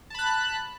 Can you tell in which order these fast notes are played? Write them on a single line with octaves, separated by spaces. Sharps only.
A5 B5 F#6